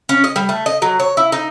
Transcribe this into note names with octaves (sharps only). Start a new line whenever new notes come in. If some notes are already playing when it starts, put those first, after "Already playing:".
C#4
D#5
G3
A3
D#5
F#3
C#5
E4
D#4